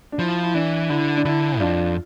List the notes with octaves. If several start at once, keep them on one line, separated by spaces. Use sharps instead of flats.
D4
F3 E4
E4
E3 D4
D3 E4
D4
D3 E4
F2 D4 F4